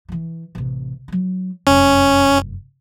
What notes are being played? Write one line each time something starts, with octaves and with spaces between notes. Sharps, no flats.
E3 F3
A1 C3
F#3 D#4
F1 F#2 C#4